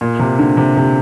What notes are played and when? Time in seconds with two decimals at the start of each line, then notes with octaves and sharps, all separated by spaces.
0.01 A#2
0.19 C3
0.39 D3
0.57 C3
0.77 C3